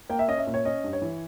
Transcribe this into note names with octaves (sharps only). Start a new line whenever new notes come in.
A#3 G5
E5
C#4 D#5
E5
A#2
C#5
C#4 D#5
G2
C#5
E3